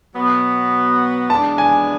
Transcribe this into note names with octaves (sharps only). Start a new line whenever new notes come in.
B2 F#3 B3
E3 G#3 B3 D4 A5
G#5